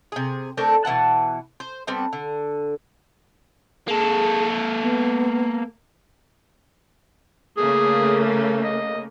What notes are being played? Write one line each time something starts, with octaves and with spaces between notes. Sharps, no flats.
C3 G#4
A3 C4 D4 A#4
B2 E3 F#5 A5
C5
G3 B3 C4 D4
D3
A#3 G#4 A4
B3
C#3 A3 A#3 G#4
D#5